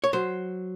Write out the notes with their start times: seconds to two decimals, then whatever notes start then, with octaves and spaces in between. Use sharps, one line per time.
0.04 C#5
0.13 F#3 C5